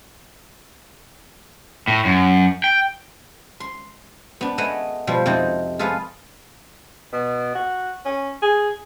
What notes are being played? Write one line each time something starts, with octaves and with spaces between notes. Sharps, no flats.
A2
F#2
G5
C6
B3 D4
A3 B3 G#4 D#5 F#5
B2 F3 G3
F2 C3 C4 D#4
F4 G#4 A4 B4 F5
B2
F#4
C#4
G#4